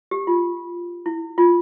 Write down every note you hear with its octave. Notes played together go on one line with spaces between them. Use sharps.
G4
F4
E4
F4